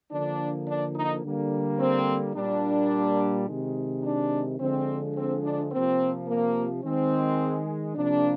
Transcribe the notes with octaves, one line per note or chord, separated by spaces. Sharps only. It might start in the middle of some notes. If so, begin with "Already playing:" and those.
D3 F3 A#3 D4
D4
D#4
D3 G3 A#3
C4
A#2 G3 A#3 D4
C3 D#3 G#3
D4
D3 F3 G#3 C4
C4
D4
C3 F3 A#3 C4
A#3
D#3 G#3 C4
C3 F3 A#3 D4